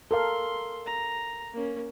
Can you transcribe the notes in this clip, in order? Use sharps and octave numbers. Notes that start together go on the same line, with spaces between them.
A4 A#4 F5 C6
A#5
A#3 C#4